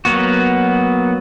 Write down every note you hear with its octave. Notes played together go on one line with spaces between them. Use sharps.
F#3 A#3 B3 F#4